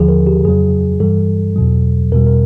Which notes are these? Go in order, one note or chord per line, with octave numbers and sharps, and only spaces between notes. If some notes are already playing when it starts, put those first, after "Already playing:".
Already playing: D#2 D3 F3 G#4
A#4
G4
F2 C#3 F#3 G#4
G2 E3 G3 A4
E2 B2 F#3
E2 B2 G3 A#4
A#4